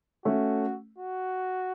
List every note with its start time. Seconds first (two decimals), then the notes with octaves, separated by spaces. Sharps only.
0.25 A3 C#4 F#4
0.99 F#4